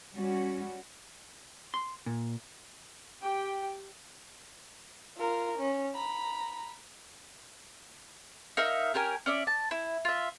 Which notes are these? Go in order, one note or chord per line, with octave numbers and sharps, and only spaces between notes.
G3 C#4 F#4
C6
A#2
G4 G5
F4 A#4
C#4
A#5 B5
D#4 A#4 E5 F5
C#4 G4 A#4 G#5
C#4 D5 E5
A5
E4
F4 E5